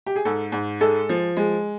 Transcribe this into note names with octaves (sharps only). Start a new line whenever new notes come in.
G4
G#4
G#2 A4
G#2
G#3 A4
F3
G#3